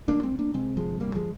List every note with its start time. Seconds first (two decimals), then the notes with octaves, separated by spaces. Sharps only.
0.08 D2 A#3 D4
0.23 G#3 C4
0.31 D2
0.39 A#3 D4
0.54 C3 G#3 C4
0.76 G1 F3 G#3
1.00 D2 G3 A#3
1.15 F3 G#3